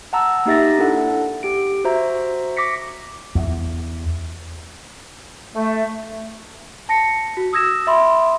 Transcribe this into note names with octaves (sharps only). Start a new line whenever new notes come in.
F#5 A5 A#5 E6
A#3 D#4 G4 E5 A6 A#6
D4 E4 A4 F#5
G4 D7
F#4 C5 E5 A#5
C#6 D6 A#6 B6 C#7
E2
A3
A5 A#6 C#7
F#4
D#6 E6 G#6 A#6 E7
E5 B5 C6